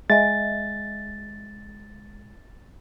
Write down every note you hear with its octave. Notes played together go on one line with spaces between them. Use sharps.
G#3 D#5 E5 G#5 A6